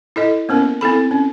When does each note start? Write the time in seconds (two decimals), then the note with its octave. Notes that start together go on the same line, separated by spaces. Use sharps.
0.16 E4 A4 D#5
0.49 A#3 B3 C#4 A#4
0.81 C4 E4 A4 B5
1.11 C#4